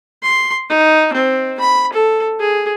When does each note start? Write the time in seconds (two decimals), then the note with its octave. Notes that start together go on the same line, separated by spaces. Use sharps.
0.23 C6
0.69 D#4
1.13 C4
1.60 B5
1.93 A4
2.40 G#4